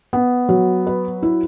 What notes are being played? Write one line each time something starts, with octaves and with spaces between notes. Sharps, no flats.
B3
F#3
B4
E4